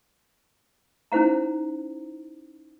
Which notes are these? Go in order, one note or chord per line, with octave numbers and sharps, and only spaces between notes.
C#4 D#4 E4 C5 F#5 A#5